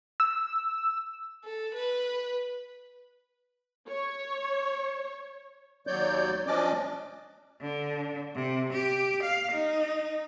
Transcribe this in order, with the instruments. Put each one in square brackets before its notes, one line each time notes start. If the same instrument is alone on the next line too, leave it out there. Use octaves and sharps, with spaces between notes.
[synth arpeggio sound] E6
[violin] A4
B4
[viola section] C#5
[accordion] D#2 F#3 C#5 D5 G6
F3 C#4 D4 D5 D#5 D6
[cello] D3
C3
G4
F5
D#4